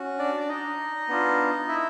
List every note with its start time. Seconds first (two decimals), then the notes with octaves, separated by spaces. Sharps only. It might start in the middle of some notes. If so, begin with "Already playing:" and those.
Already playing: C#4 F#4
0.18 D4 D5
0.41 D5
0.49 D#4 D#5
1.08 B3 D4 F4
1.68 E4 E5